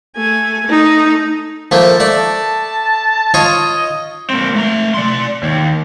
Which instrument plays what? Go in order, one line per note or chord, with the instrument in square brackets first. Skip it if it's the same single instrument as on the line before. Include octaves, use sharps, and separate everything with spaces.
[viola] A3 G#5
A3 D#4
[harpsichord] F3 A3 A#3 [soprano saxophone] A5
[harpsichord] A3 D5
[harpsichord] F4 C#5 [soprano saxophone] D#5
[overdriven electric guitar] A#3 C4
A3 A#5
D5 C6
D#2